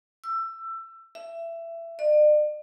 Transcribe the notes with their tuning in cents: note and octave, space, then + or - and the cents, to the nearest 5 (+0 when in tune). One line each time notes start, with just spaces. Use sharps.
E6 +20
E5 +20
D5 +40